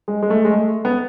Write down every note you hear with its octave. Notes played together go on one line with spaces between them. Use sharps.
G#3
G#3
A3
G#3
A3
B3